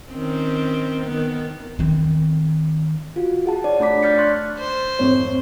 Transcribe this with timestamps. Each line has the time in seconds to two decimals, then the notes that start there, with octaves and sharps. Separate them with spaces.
0.10 D#3 C4 C#4
1.06 D#3 B3
1.79 D#3 C4
3.16 F4 F#4
3.46 G#4 F#5 A5
3.64 D#4 C#5 D5
3.80 A3 D4 B5 D6 B6
4.02 D5 F6 G6 A6 B6 C#7
4.18 C6 C#6 F#6 G6 A6
4.58 C5
4.99 G#1 F2 C#5